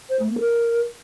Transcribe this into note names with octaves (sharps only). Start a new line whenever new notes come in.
C5
A3
A#3
A#4